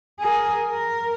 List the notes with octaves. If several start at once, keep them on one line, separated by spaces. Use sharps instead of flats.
G#4 A#4
A#4